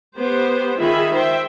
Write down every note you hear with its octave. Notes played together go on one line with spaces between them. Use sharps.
B3 G4 C5
D#3 F4 G#4 E5 B5
C5 E5 G5